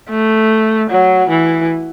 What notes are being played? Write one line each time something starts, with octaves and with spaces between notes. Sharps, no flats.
A3
F#3
E3